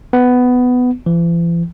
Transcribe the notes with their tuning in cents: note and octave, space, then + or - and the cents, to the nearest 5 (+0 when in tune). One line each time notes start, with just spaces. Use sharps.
B3 +10
E3 +45